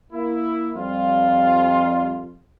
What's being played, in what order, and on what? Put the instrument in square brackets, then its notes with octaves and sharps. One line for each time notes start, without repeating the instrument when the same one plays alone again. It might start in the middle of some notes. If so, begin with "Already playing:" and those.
[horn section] A#3 E4
[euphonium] F2 [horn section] G3 F4